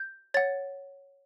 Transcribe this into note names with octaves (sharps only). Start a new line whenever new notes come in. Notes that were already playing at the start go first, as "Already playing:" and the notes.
Already playing: G6
C#5 F#5 A6